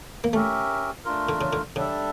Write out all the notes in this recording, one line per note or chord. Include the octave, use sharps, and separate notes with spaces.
A#3
A3 C#4 G4 A#4 E5
A3 D4 F4 A#4
D3
C#3
D3
C#3 G3 D4 A4 E5